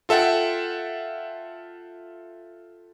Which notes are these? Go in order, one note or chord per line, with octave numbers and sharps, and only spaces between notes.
F4 A4 E5 F#5 G5